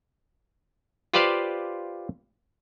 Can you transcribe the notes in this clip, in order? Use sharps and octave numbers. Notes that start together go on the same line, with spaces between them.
F4 G4 B4 C5 D5 F5